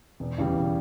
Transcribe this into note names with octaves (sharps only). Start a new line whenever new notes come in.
E1
E2 C#3 E3 G3
E1